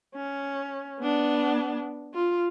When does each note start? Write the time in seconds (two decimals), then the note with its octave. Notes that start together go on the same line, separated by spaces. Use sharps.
0.15 C#4
1.00 B3 D4
2.14 F4